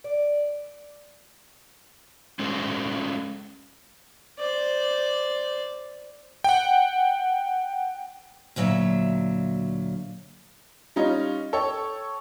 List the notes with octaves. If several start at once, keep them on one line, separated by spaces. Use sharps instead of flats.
D5
G#3 C#4 G#4 A4 C5
C5 D5
F#5 G5
D2 A#2 F#3 E5
G3 C#4 D#4 F4
A4 C#5 G5